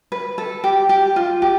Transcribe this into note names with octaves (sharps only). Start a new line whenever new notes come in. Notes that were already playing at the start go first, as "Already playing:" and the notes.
B4
A4
G4
G4
F4
G4